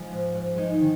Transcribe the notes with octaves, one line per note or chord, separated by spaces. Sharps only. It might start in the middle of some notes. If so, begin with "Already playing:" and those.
Already playing: F3 G#3
G#2
G#2
G#3 D#4
D#4
D#3